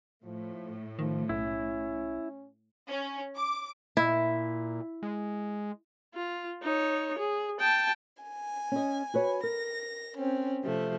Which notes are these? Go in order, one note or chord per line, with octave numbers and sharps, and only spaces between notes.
A2 F3
D#3 F3
B1 C#4 E4
C#4
D6
A#2 E4
G#3
F4
D#4 C#5
G#4
G5 A5
G#5
C#4 D#5
F#4 B4 C#5
A#4 A#6
C4 C#4
C3 F3 A3